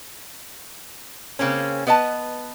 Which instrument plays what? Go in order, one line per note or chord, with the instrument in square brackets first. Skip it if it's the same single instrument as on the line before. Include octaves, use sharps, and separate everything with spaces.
[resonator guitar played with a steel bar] C#3 A#3 C4 C#4
B3 B4 D#5 F5 A5